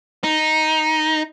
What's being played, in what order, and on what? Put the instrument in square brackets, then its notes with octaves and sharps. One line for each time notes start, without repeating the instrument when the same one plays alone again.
[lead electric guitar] D#4